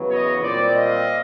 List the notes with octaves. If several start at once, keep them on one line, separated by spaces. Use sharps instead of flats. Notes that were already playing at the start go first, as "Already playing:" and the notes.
Already playing: E2 C#3 F#3 B3
C#5 D#5
A#2 G3 C4 C5 D5
D#5 F5